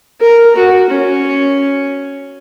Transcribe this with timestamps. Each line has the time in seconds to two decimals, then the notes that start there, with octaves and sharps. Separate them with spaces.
0.20 A#4
0.56 F#4
0.90 C#4